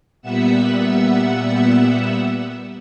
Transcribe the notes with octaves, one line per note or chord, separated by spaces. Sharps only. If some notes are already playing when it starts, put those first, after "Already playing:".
A#2 G3 B3 E5 F#5 E6